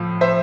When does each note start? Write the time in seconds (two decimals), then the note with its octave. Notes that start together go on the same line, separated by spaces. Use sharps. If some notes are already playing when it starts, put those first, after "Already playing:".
Already playing: A2 F3
0.21 C5 E5